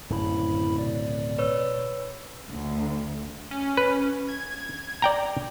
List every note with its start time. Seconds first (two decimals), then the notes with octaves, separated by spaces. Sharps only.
0.10 D1 F#2 C#3 E4 B5
0.78 B2 D5
1.39 B4 C#5 E6
2.50 D2
3.51 C#4
3.77 B4
4.28 G#6
5.02 D5 G5 A#5